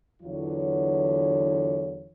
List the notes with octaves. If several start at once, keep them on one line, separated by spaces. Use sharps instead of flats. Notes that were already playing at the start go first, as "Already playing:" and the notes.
E2 D3 E3 F#3 F4 C#5